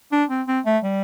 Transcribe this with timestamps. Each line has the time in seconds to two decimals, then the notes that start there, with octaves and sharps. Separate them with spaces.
0.12 D4
0.30 C4
0.48 C4
0.66 A3
0.84 G3